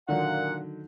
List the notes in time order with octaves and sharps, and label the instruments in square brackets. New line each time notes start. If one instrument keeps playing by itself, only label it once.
[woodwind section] A#2 F#5 [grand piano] D3 D#3 F#3